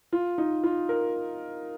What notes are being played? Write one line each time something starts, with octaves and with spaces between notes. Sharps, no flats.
F4
D#4
F4
A#4